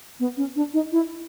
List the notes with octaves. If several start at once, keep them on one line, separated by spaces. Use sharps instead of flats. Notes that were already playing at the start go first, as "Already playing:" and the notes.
B3
C#4
D4
D#4
E4